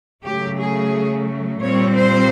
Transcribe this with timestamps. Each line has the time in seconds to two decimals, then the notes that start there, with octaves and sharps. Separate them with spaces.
0.24 C#3 F#3 A3 G4
0.59 G#4
1.61 A#2 G3 C4 C#5
1.96 C5